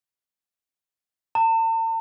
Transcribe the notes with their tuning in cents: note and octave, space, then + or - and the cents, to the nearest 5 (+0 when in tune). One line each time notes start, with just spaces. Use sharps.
A5 +45